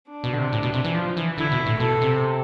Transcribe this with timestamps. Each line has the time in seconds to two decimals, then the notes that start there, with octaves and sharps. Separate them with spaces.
0.10 D4
0.24 B2
0.33 D3
0.38 C3
0.52 A2
0.63 B2
0.74 C3
0.84 E3
0.94 F3
1.17 E3
1.37 D3 E4
1.51 B2
1.66 A2
1.80 B2 A4
2.01 C3